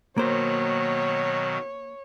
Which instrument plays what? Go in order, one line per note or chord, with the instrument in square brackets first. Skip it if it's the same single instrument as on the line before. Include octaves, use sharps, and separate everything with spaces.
[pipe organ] B2 D#3 F#3 [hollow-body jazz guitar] A#3 C5 [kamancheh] C#5